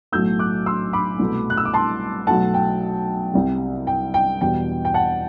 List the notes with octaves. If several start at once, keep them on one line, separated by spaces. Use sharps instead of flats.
B1 A2 F#3 A3 E6 G6
D6 F#6
C6 E6
B5 D6
C2 B2 A3
F#6
E6
D6
A5 C6
B1 B2 F#3 A3 F#5 A5
G5
C2 C3 G3
G5
G5
E2 B2 G3 G5
G5
F#5 A5